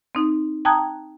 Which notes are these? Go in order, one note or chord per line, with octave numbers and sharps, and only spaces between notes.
C4 D#4
G5 A5 A#5 D#6 F#6 G#6